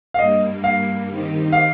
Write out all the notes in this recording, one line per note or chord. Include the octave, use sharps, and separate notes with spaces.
F5
G2 G3 A#3 D#5
F5
D#3 C4 D#4 G4
F5